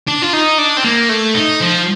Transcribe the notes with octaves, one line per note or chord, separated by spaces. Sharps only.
D4
F4
D#4
D4
C4
A#3
A3
D#4
F3